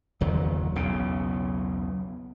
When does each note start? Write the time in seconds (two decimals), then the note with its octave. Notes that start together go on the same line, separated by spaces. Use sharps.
0.21 F#1 E2 D#3 F#3
0.76 B1 E2 C#3